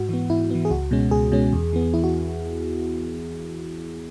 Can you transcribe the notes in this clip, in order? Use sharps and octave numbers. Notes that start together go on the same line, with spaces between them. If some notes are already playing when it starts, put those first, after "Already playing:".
Already playing: G#2 F#4
E3 B3
G#2 E4
E3 B3
G#4
C#2 F#4
B2 G#3 C#4
C#2 G#4
B2 G#3 C#4
E2
E3 B3
E2 E4
F#4